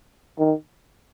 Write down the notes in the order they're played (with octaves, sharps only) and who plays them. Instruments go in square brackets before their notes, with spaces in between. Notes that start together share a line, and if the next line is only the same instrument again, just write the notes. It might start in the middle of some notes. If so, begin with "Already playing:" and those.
[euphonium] D#3